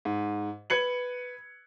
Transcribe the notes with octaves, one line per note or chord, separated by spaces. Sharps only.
G#2
B4 G#6 C#7 F#7